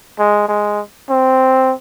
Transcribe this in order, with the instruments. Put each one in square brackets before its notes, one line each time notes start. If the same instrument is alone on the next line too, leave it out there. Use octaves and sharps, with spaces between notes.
[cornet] G#3
G#3
C4